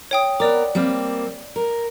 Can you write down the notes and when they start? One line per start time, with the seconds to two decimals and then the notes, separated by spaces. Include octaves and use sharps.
0.11 C#5 G5 D#6
0.40 B3 A#4 D5 D6
0.75 G3 A#3 C4
1.56 A#4